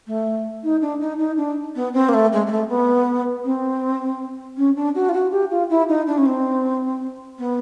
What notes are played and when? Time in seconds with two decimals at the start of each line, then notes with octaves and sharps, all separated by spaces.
0.07 A3
0.63 D#4
0.81 D4
1.00 D#4
1.18 D#4
1.37 D4
1.76 B3
1.94 C4
2.09 A#3
2.14 A3
2.32 G#3
2.46 G#3
2.51 A3
2.69 B3
3.45 C4
4.57 C#4
4.76 D4
4.95 F#4
5.09 F4
5.13 F#4
5.31 G4
5.50 F4
5.70 E4
5.89 D#4
6.07 D4
6.18 C#4
6.26 C4
7.38 B3